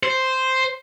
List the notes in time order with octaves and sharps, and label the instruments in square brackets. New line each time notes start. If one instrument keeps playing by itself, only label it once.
[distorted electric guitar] C5